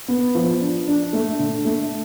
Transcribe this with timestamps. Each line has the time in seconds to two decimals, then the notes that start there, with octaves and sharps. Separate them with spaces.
0.08 B3
0.35 F3
0.61 D4
0.88 D4
1.13 A3
1.39 D3
1.65 A3